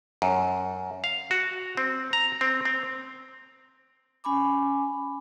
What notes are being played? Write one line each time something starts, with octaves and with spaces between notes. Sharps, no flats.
F#2
F5
F#4
C4
A#5
C4
C4
C#4 G#5 B5 D6